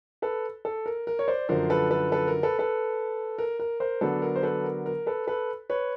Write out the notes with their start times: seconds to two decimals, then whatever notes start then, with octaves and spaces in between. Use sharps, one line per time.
0.22 A4 B4
0.65 A4
0.86 A#4
1.07 A#4
1.19 C#5
1.28 C5 D5
1.49 F#2 D3 F3 A#4 C5
1.70 A4 B4
1.90 A4 B4
2.12 A4 B4
2.28 A#4
2.43 A4 B4
2.59 A4 B4
3.38 A#4
3.60 A#4
3.80 A#4 C5
4.01 D3 F#3 B3 D4 A4 B4
4.22 A#4
4.36 C5
4.43 A4 B4
4.64 A#4
4.86 A#4
5.07 A4 B4
5.27 A4 B4
5.70 B4 C#5